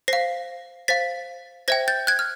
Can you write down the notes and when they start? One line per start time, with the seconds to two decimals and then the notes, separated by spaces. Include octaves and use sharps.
0.08 C5 F5 A#6 C7
0.88 C5 F5 A6 B6
1.68 C5 E5 G5 G#6 A#6
1.88 G6 A6
2.07 F#6 G#6
2.19 F6